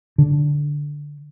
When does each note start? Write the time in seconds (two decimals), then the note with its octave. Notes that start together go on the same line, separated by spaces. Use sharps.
0.18 D3